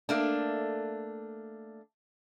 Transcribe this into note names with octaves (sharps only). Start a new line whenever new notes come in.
A3 A#3 D4